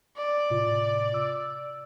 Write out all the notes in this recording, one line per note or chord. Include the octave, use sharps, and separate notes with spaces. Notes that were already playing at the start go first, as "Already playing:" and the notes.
D5
A2 C3 F4
E6